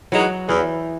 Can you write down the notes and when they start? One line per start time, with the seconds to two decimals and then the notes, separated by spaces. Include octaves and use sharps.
0.12 E3 F#3 G#3 D#4 F#4
0.49 E2 E3